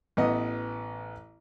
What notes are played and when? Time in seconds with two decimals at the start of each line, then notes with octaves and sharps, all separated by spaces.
0.17 A1 E3 B3 D#5